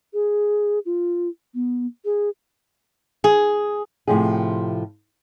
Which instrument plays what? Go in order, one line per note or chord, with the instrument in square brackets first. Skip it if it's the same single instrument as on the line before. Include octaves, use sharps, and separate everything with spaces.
[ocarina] G#4
F4
B3
G#4
[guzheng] G#4
[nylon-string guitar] A2 C3 F3 G4 G#4